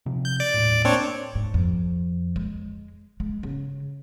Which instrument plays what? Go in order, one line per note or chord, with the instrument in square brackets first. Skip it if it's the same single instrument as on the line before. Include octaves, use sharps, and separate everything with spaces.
[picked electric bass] C3 F3
[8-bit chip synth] G6
D5 D6
[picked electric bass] D#1 A2
[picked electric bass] A#3 [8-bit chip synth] C4 D4 C#5
[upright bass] G#2
F2
G#3
G#3
C#3